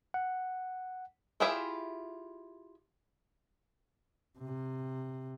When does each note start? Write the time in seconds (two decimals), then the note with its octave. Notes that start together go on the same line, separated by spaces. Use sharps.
0.14 F#5
1.40 E4 F4 G4 G#4 E5
4.39 C3